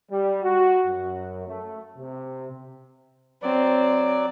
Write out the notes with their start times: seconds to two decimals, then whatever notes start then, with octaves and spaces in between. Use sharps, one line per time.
0.10 G3
0.43 F#4
0.87 F#2
1.47 A3
1.97 C3
3.42 F#3 C4 D5